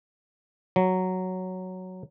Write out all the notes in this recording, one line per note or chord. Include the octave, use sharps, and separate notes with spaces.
F#3